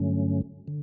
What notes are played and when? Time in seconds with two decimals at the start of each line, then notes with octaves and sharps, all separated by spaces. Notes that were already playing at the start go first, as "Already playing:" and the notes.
Already playing: G2 D3 F#3 A3 C#4
0.68 D3